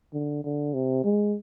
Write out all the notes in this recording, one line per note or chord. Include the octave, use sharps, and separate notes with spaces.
D3
D3
C3
G#3